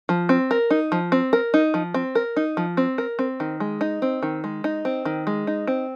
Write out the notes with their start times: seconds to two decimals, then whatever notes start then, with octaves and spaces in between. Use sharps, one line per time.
0.09 F3
0.29 C4
0.51 A#4
0.70 D#4
0.92 F3
1.12 C4
1.33 A#4
1.54 D#4
1.74 F3
1.94 C4
2.15 A#4
2.36 D#4
2.57 F3
2.77 C4
2.98 A#4
3.19 C4
3.40 D#3
3.60 G#3
3.81 D#4
4.02 C4
4.23 D#3
4.44 G#3
4.64 D#4
4.85 C4
5.05 D#3
5.27 G#3
5.47 D#4
5.67 C4